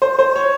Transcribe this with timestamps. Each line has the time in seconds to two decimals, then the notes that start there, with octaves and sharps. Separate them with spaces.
0.02 C5
0.19 C5
0.36 C#5